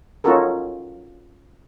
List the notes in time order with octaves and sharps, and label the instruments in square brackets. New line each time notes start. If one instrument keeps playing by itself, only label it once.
[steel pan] C#4 D#4 F4 F#4 A4 A#4